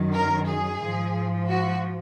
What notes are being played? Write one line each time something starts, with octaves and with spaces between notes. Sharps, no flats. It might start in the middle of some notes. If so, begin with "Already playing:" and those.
Already playing: F#2 D#3 F#3
A#4
G#4
G#2 F3
F#4